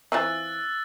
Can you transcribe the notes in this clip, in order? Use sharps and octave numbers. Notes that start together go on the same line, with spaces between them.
E3 C4 F4 E6 F#6 A6